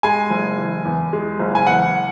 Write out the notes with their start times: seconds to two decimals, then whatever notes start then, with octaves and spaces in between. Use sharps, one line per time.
0.03 G#3 G#5
0.30 F#1
0.58 E3
0.85 E2
1.13 G#3
1.39 F#1
1.55 G#5
1.67 E2 F#5